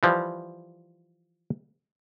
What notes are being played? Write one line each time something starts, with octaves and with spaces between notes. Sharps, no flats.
E3 F3 G3